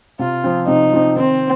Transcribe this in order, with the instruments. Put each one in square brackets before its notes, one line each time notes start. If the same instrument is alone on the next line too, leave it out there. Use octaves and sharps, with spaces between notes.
[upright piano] C3 [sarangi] F4
[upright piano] F3 C4
[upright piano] C3 [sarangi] D#4
[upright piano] F3 C4
[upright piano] D#3 [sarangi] C4